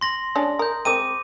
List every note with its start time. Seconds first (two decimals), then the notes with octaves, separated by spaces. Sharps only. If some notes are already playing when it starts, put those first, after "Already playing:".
0.01 C6 A#6 F#7
0.35 G#3 C#4 D4
0.59 A#4 D#6 G6
0.85 G#3 C4 A#4 D6 D#7